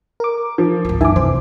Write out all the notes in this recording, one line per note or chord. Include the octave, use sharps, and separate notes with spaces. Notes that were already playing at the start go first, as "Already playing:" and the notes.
A#4 D6
F3
G#1 C#2
F#2 A2 E3 E5 G#5 A5 D6
C2 F2 C3 C5